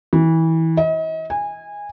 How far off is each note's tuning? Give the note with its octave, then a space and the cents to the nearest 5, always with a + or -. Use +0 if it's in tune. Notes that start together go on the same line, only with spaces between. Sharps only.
E3 -25
D#5 +40
G#5 -20